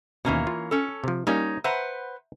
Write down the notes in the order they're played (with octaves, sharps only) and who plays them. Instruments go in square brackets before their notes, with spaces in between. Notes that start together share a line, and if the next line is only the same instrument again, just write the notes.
[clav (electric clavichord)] D#2 B2 [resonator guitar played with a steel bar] E3 A#3 C#4
[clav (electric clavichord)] F4
[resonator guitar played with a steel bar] C#4 A4
[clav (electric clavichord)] C3 F3
[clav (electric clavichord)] G3 A#3 C#4 [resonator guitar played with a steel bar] D#4 C#5
[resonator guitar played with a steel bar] B4 C5 F#5 [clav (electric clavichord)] E5 A#5